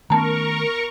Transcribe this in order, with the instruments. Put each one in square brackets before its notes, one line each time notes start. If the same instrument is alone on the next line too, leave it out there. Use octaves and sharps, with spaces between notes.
[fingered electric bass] D#3 A3 C#4 [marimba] B3 A5 A#5 [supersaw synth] A#4 C#6